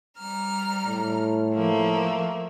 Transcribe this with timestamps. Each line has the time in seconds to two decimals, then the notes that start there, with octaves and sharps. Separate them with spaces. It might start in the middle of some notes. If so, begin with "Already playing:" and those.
0.18 G3 A#5 F6
0.86 A2
1.53 F3 A3 A#3